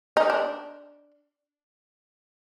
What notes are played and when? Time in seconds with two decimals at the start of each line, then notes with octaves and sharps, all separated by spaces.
0.17 D#4
0.30 D4